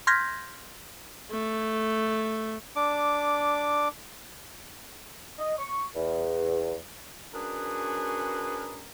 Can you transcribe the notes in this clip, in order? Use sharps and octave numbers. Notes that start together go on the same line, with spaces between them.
C6 F6 G6 G#6 A#6 B6
A3
D4 D6
D#5
C#6
E2
C#4 D4 F#4 G#4 A#4 B4